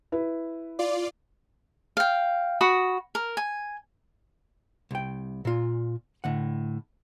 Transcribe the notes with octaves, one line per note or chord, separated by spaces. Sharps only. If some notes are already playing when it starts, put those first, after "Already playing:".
E4 B4
F4 D5
F5 G5
F#4 B5 D#6
A#4
G#5
C2 G5
A#2 F4
A2 D3 F#5